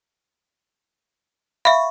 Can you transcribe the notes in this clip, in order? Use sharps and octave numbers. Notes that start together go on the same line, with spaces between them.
E5 F5 B5 C#6